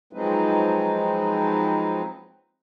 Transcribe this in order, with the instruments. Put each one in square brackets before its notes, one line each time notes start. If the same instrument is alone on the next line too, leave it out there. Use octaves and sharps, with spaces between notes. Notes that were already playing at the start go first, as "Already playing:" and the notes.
[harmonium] F3 F#3 G#3 C4 D#4 B4